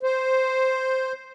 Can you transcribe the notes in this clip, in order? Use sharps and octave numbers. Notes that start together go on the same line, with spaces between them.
C5